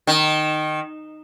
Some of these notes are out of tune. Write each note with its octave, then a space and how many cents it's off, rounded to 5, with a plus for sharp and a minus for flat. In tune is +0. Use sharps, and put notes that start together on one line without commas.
D#3 -15